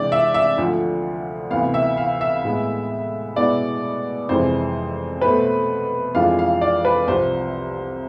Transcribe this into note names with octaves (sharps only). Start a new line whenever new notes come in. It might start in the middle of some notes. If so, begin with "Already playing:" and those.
Already playing: C3 E3 G#3 D4 D5
E5
E5
D2 D3 F3
D2 C3 E3 B3 F5
E5
F5
E5
A2 G#3 B3
B2 G#3 B3 E4 D5
F2 C3 E3 G#3 C5
B2 A3 C4 B4
F2 E3 G#3 D4 F4 F5
F5
D5
B4
C2 C3 F3 C5